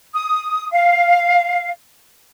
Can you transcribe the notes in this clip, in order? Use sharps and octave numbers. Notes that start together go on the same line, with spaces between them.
D#6
F5